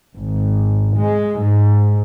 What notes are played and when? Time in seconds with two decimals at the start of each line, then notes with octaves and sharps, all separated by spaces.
0.15 G#1
0.95 G#3
1.39 G#2